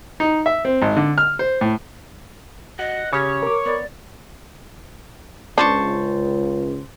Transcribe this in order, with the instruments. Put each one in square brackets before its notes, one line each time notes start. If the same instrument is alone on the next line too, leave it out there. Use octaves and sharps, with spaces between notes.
[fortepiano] D#4
E5
C4
G#1
D3
F6
C5
A2
[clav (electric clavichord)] F#4 [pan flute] D#5 [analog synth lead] F#5
[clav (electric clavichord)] C#3 C#4 [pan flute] G4 [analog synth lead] C#5
[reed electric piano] A#4 D6
[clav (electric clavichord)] B3 [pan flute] D5
[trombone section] C#2 [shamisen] D4 [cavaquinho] C5 A5 C#6